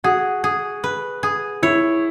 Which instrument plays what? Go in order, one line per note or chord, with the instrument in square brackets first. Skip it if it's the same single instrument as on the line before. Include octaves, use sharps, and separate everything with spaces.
[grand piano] F#4 [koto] G#4
[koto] G#4
B4
G#4
[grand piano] E4 [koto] C#5